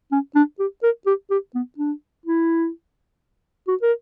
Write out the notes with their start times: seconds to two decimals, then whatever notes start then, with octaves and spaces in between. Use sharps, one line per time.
0.12 C#4
0.35 D4
0.59 G4
0.83 A#4
1.06 G4
1.30 G4
1.55 B3
1.78 D4
2.25 E4
3.68 F#4
3.82 A#4